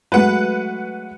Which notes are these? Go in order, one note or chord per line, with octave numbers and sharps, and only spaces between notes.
F#3 G#3 A3 B4 F#5